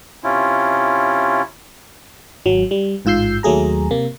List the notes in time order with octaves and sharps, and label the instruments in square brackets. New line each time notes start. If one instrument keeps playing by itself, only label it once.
[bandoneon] C3 C#4 E4 F4
[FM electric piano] G#1 F#3
G3
A1 G#2 F4 E6 G6 C7
D#2 F#3 A3 G#4 A#5
C3 A#3